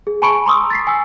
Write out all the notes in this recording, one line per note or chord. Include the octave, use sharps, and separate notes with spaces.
G#4
G#5 A5 B5 C#6 C#7 D7
A#5 C6 C#6 D#6 E6
A6 B6 C7
G#5 E6